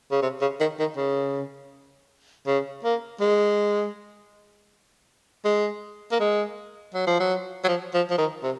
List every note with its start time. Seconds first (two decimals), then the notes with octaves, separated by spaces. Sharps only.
0.11 C#3
0.22 C3
0.41 C#3
0.60 D#3
0.79 D#3
0.97 C#3
2.47 C#3
2.84 A#3
3.21 G#3
5.45 G#3
6.12 A#3
6.20 G#3
6.94 F#3
7.07 F3
7.20 F#3
7.64 F#3
7.68 F3
7.94 F3
8.10 F3
8.18 D#3
8.43 C3